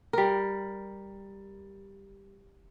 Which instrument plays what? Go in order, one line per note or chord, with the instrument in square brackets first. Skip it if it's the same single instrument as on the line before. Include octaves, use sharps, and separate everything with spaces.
[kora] G3 A#4